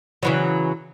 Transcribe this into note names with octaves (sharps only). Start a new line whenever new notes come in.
C#3 E3 F#3